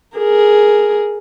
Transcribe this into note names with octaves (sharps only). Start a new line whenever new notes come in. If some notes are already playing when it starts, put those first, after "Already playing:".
G#4 A#4